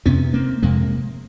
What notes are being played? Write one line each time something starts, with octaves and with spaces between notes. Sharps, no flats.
F2 C3 B3 C#4
A#3 C4
F2 C3 G#3 A#3